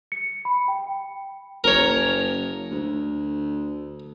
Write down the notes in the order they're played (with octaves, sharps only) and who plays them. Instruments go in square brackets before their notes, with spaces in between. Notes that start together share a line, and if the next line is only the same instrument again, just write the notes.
[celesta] C#7
B5
G5
[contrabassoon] F#1 [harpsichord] A#4 C#5
[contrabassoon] D2